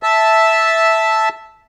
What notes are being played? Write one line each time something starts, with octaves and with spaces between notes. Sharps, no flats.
E5 A5